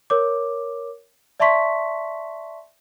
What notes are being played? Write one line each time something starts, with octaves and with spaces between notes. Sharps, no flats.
A#4 C#5 D6
D5 E5 A5 C6 C#6 B6